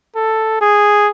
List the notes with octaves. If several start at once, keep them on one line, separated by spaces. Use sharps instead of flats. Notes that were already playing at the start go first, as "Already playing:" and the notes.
A4
G#4